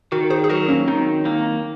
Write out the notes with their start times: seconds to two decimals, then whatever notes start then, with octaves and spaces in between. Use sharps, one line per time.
0.12 D#3 F#4 A#4
0.30 G#4 C5
0.44 G#4
0.49 F#3 F#4 A#4
0.69 A#3 C#4
0.88 D#3 C4 D#4
1.25 A#3 C4 D#4